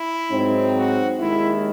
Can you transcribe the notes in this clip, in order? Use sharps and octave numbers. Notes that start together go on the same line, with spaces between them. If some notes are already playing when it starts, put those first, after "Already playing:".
Already playing: E4
G#2 F#3 C4 D#4
F#4
D#2 D#3 G#3 E4